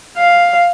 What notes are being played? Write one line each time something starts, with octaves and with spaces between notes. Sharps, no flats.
F5